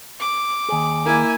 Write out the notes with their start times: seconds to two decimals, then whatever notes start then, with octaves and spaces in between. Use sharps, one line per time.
0.20 D6
0.69 D#2 G#4
1.06 A#3 E4 G#5